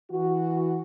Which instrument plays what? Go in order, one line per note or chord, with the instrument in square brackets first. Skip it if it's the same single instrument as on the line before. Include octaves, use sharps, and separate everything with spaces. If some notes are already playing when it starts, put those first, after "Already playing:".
[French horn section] E3 F#4